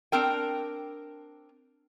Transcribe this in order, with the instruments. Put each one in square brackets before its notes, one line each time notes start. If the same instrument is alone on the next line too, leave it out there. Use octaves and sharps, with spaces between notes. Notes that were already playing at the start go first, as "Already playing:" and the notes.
[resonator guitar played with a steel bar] C4 D4 A#4 G5